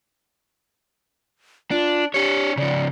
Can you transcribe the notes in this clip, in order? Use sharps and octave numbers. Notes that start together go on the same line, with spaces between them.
D4 F4
D4 G4 C#5
C#3 F3 D5